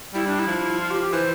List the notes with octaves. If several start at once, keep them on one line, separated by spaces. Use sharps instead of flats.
G3 E4
D4
E4
F3
F4
G4
G4
E3 C5